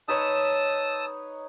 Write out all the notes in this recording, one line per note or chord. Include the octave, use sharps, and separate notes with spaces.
D#4 B4 C#5 A5 D#6 E6